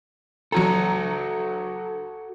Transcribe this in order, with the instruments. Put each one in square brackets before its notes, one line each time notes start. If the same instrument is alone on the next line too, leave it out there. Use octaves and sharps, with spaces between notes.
[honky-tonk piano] F#3 A#5 [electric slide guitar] F#4 A4